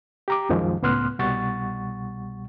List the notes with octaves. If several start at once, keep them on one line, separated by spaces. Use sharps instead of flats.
G4 A#5 D6
C2 F#2 D#3 F3 G#3
C#2 A2 B3 C6 F6 F#6
C2 B2 G3 F#5 C#6 A6